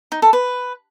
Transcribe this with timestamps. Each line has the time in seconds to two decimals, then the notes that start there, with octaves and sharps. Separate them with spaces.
0.12 D#4
0.22 A4
0.33 B4